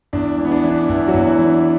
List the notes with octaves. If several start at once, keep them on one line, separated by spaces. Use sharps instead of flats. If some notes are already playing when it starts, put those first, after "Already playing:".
E2 D4
E3
B3
D4
E3
D4
E2 E3 E4
F#3 F#4
E2
E3 E4
E3
D4